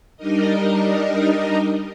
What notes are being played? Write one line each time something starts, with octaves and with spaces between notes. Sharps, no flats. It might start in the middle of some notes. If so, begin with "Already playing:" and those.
G3 D4 D#4 A#4 D#5